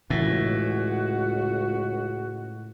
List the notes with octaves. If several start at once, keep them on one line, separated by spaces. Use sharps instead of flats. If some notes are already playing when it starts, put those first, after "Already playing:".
C#2 A2 E3 F#4